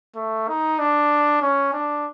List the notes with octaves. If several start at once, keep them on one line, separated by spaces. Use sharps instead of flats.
A3
D#4
D4
C#4
D4